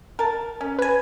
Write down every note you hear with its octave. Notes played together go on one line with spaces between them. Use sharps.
A#4 A5
C#4
B4 G#5